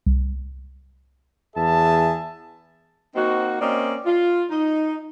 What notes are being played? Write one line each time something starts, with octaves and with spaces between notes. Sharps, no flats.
C2
E2 G#4 E5 A5
A#3 C4 D#4 F#4
A#3 C4 C#4 D5 D#5
F4
D#4